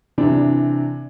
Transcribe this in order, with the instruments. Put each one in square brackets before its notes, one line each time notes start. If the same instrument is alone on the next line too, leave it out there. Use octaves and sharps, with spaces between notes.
[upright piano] C3 E3 D4